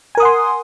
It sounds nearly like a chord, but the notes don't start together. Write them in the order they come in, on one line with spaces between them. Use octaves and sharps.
G#5 A#4 D#6 F#5 C6